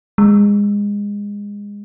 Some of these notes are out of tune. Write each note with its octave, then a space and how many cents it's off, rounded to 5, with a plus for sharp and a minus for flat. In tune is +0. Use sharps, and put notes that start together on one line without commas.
G#3 -25